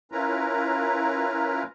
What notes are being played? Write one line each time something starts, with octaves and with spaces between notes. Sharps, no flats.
C#4 E4 F4 A#4 B4 A#5